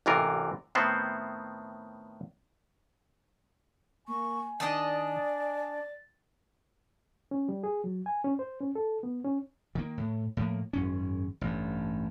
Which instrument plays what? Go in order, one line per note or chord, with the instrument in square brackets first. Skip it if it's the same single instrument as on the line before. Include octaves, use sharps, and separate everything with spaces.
[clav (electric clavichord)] A1 G#2 C3 E3 F4 A#4
A2 D#3 B3 C4 C5
[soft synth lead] A#3 [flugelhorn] G#5 [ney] C#6
[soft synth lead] D#3 [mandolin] D4 D#5 A5 [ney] D5
[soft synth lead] A6
[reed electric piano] C#4
G3
G#4
F#3
G#5
C#4
C5
C#4
A4
B3
C#4
[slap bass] D#3 A#3
A2
A2 F3 A#3
G#1 F#2 C#4
A1 G2